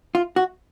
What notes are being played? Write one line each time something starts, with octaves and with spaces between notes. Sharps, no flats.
F4
F#4